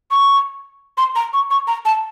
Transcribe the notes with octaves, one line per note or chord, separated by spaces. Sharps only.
C#6
C6
A#5
C#6
C#6
A#5
A5